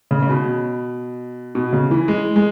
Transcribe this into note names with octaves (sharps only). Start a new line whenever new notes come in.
C#3
C#3
B2
B2
C#3
E3
G#3
G#3